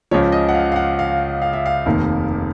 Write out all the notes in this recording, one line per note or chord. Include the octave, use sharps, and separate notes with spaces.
C#2 C#3 F3 C#5
D#5
F#5
F5
F5
F#5
F5
F5
E5
F5
F1 D#2 D#3